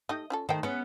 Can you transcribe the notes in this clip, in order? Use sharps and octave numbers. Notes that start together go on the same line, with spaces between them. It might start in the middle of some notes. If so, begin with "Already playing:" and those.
A3 D#4 G4 D#5
C#4 F4 A4
D#3 A3 A#3 C5 G5
G#3 B3 C#4